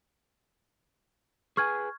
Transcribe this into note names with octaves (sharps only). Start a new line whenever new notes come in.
G#4 B4 G#5 C#6 F6 G#6